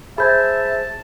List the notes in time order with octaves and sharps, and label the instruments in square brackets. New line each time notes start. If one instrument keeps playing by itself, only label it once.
[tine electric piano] G#4 C5 [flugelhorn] E5 [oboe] A5 [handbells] B5 G6 G#6